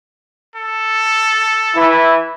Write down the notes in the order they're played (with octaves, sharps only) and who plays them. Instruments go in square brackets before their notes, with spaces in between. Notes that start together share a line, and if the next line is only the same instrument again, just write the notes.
[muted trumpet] A4
[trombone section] E3 E4